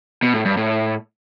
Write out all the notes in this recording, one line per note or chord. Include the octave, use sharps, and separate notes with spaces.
B2
A2
G2
A2